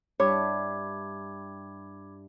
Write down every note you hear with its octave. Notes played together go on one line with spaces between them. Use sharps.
G2 E4 C#5 B5 D6 G#6